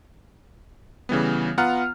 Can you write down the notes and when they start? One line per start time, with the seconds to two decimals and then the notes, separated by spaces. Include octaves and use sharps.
1.09 C#3 E3 G3 B3
1.58 B3 F4 F#5 A#5 F6